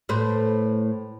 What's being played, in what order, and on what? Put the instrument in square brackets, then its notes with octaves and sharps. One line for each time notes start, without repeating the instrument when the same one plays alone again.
[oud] A2 B4 C5